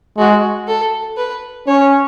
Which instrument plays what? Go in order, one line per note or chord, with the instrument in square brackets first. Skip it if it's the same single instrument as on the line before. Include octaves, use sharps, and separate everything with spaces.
[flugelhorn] G#3 [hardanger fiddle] F#4
[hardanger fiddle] A4
B4
[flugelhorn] C#4 [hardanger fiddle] C#5